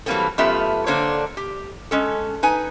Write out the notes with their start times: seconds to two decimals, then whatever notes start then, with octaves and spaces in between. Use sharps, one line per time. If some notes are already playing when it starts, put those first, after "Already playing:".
0.06 E3 F#3 G3 A#3 C4 A4
0.38 F#2 A3 B3 F4 G4 E5
0.86 D3 A#3 D4 A4 C5 C#5
1.37 G4
1.91 G#3 C#4 A4
2.43 D#4 B4 G#5